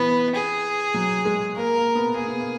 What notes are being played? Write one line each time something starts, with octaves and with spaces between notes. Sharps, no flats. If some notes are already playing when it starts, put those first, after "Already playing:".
Already playing: E3 B3
G#4
F#3
G#3
A#3 A#4
A#3
B3
A#3 G#4
B3
A#3